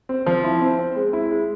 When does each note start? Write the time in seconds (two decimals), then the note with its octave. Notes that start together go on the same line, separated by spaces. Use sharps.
0.09 C4
0.27 F3
0.44 E4
0.61 C4
0.79 C4
0.96 G#3
1.13 E4
1.31 G#3